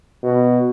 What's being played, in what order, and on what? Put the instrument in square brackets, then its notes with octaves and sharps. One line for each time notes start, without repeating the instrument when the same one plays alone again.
[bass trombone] B2